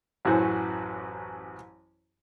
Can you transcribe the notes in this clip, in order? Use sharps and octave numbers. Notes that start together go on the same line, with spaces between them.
A1 F#2 E3 F#4 C5